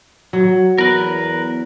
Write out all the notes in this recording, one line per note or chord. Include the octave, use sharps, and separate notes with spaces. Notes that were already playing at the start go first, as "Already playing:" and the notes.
F#3
E2 A#4 B4